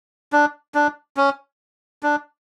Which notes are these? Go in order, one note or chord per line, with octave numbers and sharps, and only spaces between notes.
D4
D4
C#4
D4